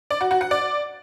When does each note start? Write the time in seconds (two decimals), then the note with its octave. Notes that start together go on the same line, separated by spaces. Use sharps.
0.10 D5
0.21 F#4
0.31 F#4
0.41 F#5
0.51 D5